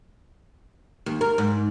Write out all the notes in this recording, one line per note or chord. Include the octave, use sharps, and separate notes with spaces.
D#2
A#4
G#2